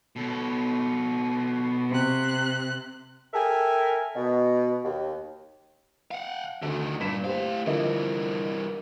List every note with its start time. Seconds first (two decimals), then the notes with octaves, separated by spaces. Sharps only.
0.16 B2 A4
1.90 C3 F#6
3.34 A4 A#4 E5 G5 G#5
4.15 B2
4.84 D#2
6.11 F5 F#5
6.62 D2 D3 D#3
7.00 G2 A#2 B6 E7
7.25 A2 G4 C5 F5
7.66 G2 D3 E3 F3 A#4 D#5